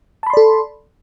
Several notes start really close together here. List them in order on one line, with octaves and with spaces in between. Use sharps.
A5 B5 C6 D5 A4